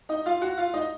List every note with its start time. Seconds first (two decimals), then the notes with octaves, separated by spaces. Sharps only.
0.09 D#4 D#5
0.26 F4 F5
0.42 F#4 F#5
0.58 F4 F5
0.74 D#4 D#5